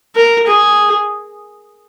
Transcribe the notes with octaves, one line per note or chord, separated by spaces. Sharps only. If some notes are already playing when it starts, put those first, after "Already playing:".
A#4
G#4